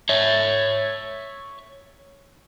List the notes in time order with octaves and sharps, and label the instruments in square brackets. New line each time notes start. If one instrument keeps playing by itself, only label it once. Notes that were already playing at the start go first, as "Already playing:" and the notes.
[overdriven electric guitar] C#5 E5